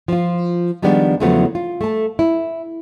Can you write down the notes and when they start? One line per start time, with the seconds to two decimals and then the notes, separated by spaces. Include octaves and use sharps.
0.08 F3 F4
0.82 D#3 F3 G3 G#3 B3 D4
1.20 E2 C#3 F3 F#3 A3 B3
1.55 F4
1.81 A3 A5
2.19 E4